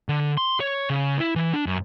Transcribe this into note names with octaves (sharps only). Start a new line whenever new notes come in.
D3
C6
C#5
C#3
E4
E3
D4
F#2